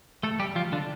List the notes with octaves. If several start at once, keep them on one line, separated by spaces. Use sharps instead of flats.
A3 A4
G3 G4
F3 F4
D3 D4